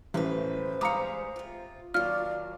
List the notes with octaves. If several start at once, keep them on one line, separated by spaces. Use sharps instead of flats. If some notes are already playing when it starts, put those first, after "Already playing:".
A1 F#2 E3 B4 C5
G3 G#3 F5 A#5 D6 D#6 C#7
C3 F4
D#2 F#3 F4 D5 F6